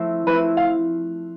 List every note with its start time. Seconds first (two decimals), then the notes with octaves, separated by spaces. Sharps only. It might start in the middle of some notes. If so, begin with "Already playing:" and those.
Already playing: F3 A3 C4 E4
0.26 F3 A3 C4 E4 B4
0.57 F5